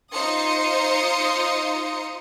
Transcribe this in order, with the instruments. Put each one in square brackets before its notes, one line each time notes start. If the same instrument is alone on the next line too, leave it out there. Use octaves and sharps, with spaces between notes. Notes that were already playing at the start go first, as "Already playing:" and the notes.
[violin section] D#4 F4 C5 C6 D#6 C#7